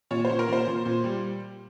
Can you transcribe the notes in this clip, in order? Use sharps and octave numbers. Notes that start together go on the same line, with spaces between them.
A#2 C#5
A#2 C5
A#4
A#2 C5
A#2
A#2
G3